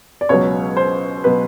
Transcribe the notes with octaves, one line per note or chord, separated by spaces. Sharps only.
D5
C#2 B2 F#3 C#5
C5
B2 F#3 B4